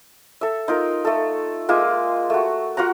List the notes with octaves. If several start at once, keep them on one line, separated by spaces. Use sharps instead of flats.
A4 E5
D#4 F4 A#4
A3 A4
G#3 A#3 F4 E5
A3 F#4
F4 F#4 F#5 A#5